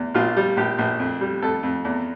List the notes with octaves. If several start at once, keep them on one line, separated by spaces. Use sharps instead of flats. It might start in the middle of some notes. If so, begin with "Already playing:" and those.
Already playing: E2
A#1 F4
G3
A#1 G4
A#1
F2
G3
F2 A4
F2
E2